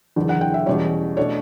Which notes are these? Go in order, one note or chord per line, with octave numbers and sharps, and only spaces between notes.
F#1 E2 D3
F#5
G5
E5
E2 B2 G3 C#4 C#5
B2 A3 D4 C#5